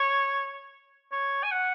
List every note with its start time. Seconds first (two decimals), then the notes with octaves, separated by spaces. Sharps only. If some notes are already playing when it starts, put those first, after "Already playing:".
Already playing: C#5
1.12 C#5
1.43 G#5
1.51 F#5